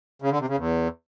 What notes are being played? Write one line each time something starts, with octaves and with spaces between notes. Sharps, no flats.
C#3
D3
C3
C#3
E2